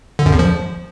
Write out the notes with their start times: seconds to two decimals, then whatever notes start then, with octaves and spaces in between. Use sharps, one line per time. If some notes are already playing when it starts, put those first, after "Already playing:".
0.19 D3
0.26 F#2
0.32 E2
0.39 F3